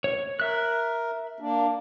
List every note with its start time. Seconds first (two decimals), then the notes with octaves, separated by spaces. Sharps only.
0.04 C#5
0.40 A#4 E5 F#6
1.40 A#3 D4